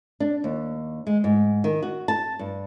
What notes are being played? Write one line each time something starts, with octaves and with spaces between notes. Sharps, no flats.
D4
D#2
G#3
G#2
D#3
F#4
A5
G2